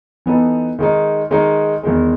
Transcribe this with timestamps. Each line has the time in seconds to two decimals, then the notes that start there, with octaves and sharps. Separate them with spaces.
0.26 E3 B3 D#4 A4
0.79 D#3 G#3 D#4
1.31 D#3 G#3 D#4
1.83 E2 D#3 G#3